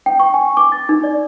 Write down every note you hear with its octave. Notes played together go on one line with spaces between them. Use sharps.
G5
C#6
G#5
D6
A6
D#4
D5